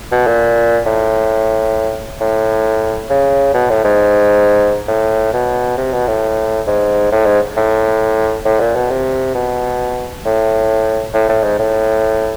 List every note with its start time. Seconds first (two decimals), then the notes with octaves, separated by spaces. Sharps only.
0.11 B2
0.27 A#2
0.86 A2
2.21 A2
3.10 C#3
3.54 B2
3.69 A2
3.84 G#2
4.88 A2
5.33 B2
5.77 C3
5.92 B2
6.07 A2
6.67 G#2
7.12 A2
7.26 G#2
7.57 A2
8.45 A2
8.60 A#2
8.75 B2
8.90 C3
9.35 B2
10.25 A2
11.13 A2
11.29 A2
11.43 G#2
11.59 A2